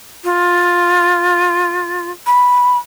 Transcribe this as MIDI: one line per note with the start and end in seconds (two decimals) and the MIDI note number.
0.24 2.10 65
2.27 2.78 83